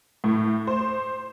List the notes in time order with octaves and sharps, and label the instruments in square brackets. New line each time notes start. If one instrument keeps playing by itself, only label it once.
[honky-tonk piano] A2
C5